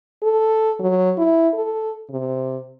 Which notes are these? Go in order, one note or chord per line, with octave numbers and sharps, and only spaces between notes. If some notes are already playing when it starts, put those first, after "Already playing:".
A4
F#3
E4
A4
C3